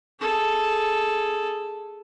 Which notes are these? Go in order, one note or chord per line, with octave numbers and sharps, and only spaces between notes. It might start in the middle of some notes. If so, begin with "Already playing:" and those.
G#4 A4